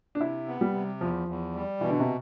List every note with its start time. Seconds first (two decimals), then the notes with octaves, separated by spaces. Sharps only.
0.15 D4
0.21 C3 E4
0.48 B3
0.61 G3
0.74 C3
1.01 E2 F3
1.28 E2
1.54 G3
1.80 B2 E3
1.90 D3
2.00 C3